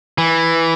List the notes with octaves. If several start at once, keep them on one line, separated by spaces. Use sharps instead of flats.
E3